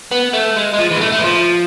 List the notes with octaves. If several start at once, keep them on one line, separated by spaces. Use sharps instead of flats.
B3
A3
G#3
G#3
F3
E3
G#3
A3
A3
E3
F3